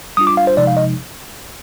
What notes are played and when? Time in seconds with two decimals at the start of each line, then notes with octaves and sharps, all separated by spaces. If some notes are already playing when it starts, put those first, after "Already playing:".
0.17 G3 D4 F4 D#6
0.27 D6
0.37 F5
0.47 C5
0.57 C3 F3 G#3 D#4 D5
0.67 F5
0.77 D#5